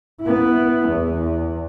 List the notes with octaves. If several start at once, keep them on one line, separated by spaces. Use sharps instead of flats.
B3 E4
E2